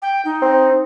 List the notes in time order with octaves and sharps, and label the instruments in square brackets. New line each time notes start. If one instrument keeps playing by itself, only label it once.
[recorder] G5
D#4
[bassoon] C4